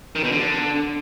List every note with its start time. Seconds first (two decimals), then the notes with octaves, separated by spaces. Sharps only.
0.15 D#3
0.24 B2
0.32 D3